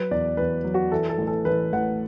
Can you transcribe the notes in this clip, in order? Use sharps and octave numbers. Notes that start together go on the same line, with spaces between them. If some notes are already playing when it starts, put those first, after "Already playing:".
Already playing: F#3 B4
E2 D5
E2 B4
F#3
F#4
E3 A4
A4
A1
A4
A1 B4
A1 F#5